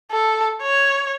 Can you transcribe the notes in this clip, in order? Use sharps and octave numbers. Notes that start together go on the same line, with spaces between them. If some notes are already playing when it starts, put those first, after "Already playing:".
A4
C#5